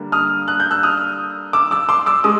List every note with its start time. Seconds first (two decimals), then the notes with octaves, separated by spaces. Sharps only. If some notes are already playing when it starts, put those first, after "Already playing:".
Already playing: D3 G3 A#3 D4
0.12 D#6 F6
0.48 F#6
0.60 G6
0.71 E6 F#6
0.83 D#6 F6
1.53 D6 E6
1.71 D6 E6
1.89 C6 D6
2.06 D6 E6
2.24 G#3 D#6